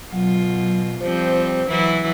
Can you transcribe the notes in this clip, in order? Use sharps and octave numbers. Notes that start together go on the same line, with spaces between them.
B2 F#3 F4
F3 G3 C4 C5
E3 F#3 E4